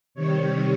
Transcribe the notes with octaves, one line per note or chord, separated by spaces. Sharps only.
C3 D#3 G3 C#5